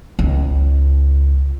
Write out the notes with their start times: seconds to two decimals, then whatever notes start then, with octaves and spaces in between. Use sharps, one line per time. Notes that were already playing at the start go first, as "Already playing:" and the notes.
0.19 C#2